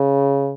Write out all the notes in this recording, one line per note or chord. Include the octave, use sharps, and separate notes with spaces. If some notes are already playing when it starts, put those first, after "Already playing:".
Already playing: C#3